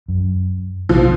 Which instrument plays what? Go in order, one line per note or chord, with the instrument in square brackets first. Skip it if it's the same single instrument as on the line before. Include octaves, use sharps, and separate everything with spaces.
[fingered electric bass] F#2
[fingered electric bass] B1 C3 D#3 [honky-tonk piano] F3